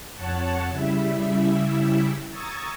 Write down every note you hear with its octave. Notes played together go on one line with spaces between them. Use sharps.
F2 C#5 F#5 A5
C#3 G3 E4 E5
A#5 C#6 D#6 E6 G#6 A6